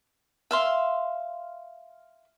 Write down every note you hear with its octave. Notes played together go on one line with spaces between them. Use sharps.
E5 F5 C6